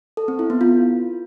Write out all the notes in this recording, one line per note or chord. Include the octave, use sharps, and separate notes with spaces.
A4
C4
E4
B3
F4